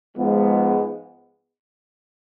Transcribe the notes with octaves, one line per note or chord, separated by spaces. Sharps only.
G#2 F3 G#3 B3